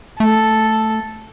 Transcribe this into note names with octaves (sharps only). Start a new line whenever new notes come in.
A3 A4